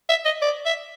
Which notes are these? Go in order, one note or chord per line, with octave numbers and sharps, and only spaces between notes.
E5
D#5
D5
E5